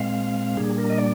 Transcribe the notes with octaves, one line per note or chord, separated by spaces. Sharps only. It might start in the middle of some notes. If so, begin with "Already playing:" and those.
Already playing: A#2 G#3 C4 F5
A#2 G3 A#3 D4 G#4
A#4
D#5
D5